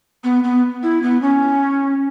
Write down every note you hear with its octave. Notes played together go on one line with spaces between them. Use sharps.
B3
B3
E4
B3
C#4